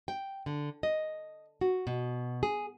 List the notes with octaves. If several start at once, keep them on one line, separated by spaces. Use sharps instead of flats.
G5
D3
D#5
F#4
B2
G#4